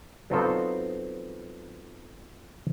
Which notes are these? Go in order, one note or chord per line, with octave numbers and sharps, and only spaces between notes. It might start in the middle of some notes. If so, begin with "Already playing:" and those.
F#3 B3 C4 D#4 F4 A4